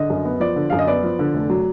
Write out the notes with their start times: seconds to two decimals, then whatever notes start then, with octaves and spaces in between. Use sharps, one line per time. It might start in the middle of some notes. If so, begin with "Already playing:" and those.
Already playing: D3 D#5
0.10 F#2
0.25 B3
0.40 F3 D5
0.56 D3
0.70 F#2 F5
0.79 D#5
0.87 B3 D5
1.04 F3
1.19 D3
1.34 F1
1.50 F#3